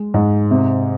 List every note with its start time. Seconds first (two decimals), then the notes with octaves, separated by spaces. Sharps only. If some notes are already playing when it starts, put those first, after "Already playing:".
Already playing: G#3
0.14 G#2
0.51 C3